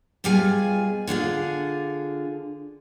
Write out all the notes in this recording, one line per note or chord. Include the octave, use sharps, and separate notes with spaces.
B2 G3 F4 G#4 G#5
D3 D4 F4 G#4